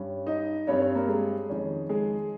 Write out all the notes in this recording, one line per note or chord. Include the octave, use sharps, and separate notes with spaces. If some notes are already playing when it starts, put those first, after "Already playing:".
Already playing: G2 G3 C#4
D#4 D#5
G2 G3 C4 C#4 C#5
C#4 C#5
A#3 A#4
G#3 G#4
F2 D#3 G#3 C#4
G#3 G#4